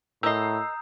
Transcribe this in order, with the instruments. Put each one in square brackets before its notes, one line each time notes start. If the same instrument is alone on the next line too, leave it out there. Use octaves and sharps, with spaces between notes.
[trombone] A2 [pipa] A#4 D#5 [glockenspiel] A#5 D#6 G6 [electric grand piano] E6 C7